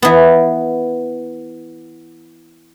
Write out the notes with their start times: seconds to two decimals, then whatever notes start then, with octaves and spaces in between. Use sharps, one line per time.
0.02 E3 B3